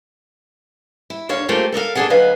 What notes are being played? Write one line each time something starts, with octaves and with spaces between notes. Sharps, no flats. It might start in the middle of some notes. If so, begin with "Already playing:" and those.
E4
D#2 D3 C#5 F5
A3 A#3 C4 F4 G4 G#4
A4 A#4 D5 F5
A#2 D4 D#4 G#4 A4 F#5
D2 F#3 B3 B4 D#5 F5